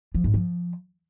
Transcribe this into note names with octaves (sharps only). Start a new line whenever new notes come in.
F3
G#2
F3